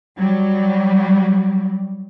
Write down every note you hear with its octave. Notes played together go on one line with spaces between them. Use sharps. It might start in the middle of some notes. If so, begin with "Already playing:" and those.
F#3 G3